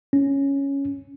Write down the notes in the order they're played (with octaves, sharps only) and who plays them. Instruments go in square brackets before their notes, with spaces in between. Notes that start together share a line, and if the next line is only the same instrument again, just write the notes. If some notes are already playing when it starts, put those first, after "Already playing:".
[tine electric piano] C#4